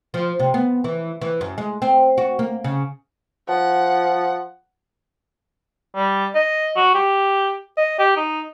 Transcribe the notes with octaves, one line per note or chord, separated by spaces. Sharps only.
F3
C3
B3
E3
E3
F#2
G#3
C4
F#4
A#3
C#3
F3 F#5
G3
D#5
F#4
G4
D#5
G4
D#4